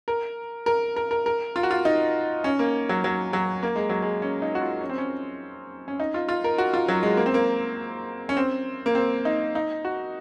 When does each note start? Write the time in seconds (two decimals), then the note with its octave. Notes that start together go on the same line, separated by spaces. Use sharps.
0.08 A#4
0.66 A#4
0.96 A#4
1.11 A#4
1.26 A#4
1.56 F4
1.63 F#4
1.71 F4
1.85 D#4
2.44 C#4
2.59 A#3
2.89 F#3
3.04 F#3
3.33 F#3
3.63 A#3
3.76 G#3
3.89 F#3
4.02 G#3
4.22 C#4
4.42 D#4
4.55 F#4
4.61 F4
4.81 C#4
4.89 C4
4.98 C#4
5.88 C#4
6.00 D#4
6.14 F4
6.29 F4
6.44 A#4
6.58 F#4
6.74 F4
6.88 F#3
7.03 G#3
7.17 A#3
7.26 C4
7.34 A#3
8.29 C#4
8.37 C4
8.86 A#3
8.95 C4
9.25 D#4
9.55 D#4
9.85 F#4